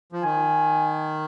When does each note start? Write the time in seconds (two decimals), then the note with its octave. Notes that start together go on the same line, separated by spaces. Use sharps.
0.12 F3
0.23 D#3 G#5